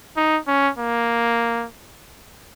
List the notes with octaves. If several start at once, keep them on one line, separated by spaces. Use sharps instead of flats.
D#4
C#4
A#3